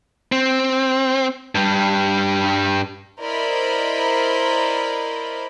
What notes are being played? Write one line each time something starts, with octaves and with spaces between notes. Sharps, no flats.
C4
G2 G3
E4 A#4 C5 D5 D#5 B5